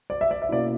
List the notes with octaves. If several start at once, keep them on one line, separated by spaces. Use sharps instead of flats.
D5
E5
D5
E5
B2 A#3 C#4 E4 D5